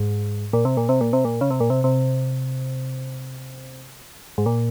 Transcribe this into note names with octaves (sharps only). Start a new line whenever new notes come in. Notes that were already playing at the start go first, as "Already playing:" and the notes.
Already playing: G#2
A#2
C3
A#2
C3
A#2
C3
A#2
C#3
C3
A#2
C3
C3
G#2
A#2